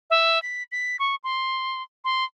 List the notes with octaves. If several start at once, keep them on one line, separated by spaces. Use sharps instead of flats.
E5
B6
B6
C#6
C6
C6